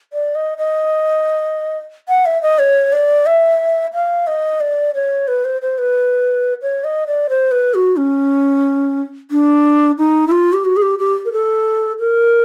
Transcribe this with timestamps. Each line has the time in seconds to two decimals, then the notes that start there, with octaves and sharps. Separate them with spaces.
0.13 D5
0.35 D#5
0.58 D#5
2.09 F#5
2.26 E5
2.42 D#5
2.59 C#5
2.93 D5
3.26 E5
3.94 F5
4.27 D#5
4.60 D5
4.95 C#5
5.28 B4
5.45 C5
5.62 C5
5.78 B4
6.62 C#5
6.84 D#5
7.07 D5
7.30 C5
7.51 B4
7.74 F#4
7.97 C#4
9.31 D4
9.98 D#4
10.28 E4
10.32 F4
10.53 G4
10.65 F#4
10.77 G#4
10.82 G4
10.99 G4
11.25 A#4
11.32 A4
11.99 A#4